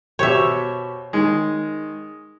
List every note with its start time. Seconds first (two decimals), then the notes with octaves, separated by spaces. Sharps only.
0.19 B2 G4 C5 C#5 E5
1.13 D#3 G#3